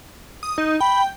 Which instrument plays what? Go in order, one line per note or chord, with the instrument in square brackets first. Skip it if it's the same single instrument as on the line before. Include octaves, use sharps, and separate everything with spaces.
[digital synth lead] D#6
D#4
[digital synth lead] G5 [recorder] B5